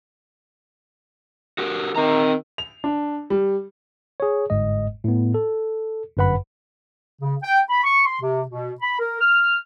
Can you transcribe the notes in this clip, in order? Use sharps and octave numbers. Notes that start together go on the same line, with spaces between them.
F#4 G4 A#4
D#3 C4 A#5
F7
D4
G3
G#4 C#5
G1 G#2 G#3 D#5
A2 B3
A4
G1 F#2 B4 F#5 B5
C#3
G5
B5
C#6
C6
C3
B2
B5
A#4
F6